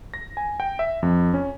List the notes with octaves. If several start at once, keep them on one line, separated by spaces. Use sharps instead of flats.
A#6
G#5
G5
E5
F2
C#4